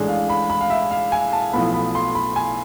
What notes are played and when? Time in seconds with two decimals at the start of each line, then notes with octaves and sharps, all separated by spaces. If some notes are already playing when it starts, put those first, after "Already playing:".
Already playing: A1 A2 G#3 D4
0.08 F5
0.29 B5
0.50 B5
0.61 F5
0.70 E5
0.91 F5
1.12 G#5
1.33 A5
1.53 B1 A2 F3 B3 B5
1.74 B5
1.95 C6
2.15 B5
2.36 G#5